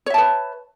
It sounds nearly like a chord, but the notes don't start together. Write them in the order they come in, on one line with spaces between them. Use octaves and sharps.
C#5 E5 A5 B4